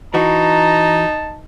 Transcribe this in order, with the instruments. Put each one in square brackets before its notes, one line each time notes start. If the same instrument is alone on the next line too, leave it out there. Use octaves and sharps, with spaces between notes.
[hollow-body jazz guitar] E3 F#4 [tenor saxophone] D#4 [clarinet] A5 [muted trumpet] A#5